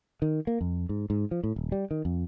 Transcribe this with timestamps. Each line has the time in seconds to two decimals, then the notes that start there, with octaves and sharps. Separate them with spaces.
0.22 D#3
0.47 A#3
0.61 F2
0.89 G#2
1.10 G#2
1.31 F3
1.44 A2
1.56 D#1
1.72 G3
1.91 D#3
2.05 F2